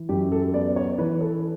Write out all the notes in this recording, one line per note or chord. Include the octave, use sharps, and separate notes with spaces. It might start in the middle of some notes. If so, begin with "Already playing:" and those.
Already playing: E3
F#2 G4
A4
B3 D5
C#5
E3 B4
A4